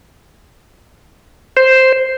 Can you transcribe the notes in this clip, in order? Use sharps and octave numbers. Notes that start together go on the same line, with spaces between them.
C5